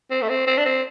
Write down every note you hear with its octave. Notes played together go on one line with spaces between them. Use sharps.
C4
A3
C4
C4
D4
C4